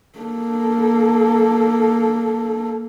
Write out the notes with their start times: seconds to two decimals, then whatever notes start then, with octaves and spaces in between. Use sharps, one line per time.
0.19 A#3 A4